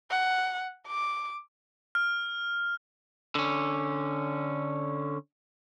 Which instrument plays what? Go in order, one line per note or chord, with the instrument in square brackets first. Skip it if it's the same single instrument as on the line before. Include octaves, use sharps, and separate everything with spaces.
[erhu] F#5
D6
[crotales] F6
[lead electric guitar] D3 C#4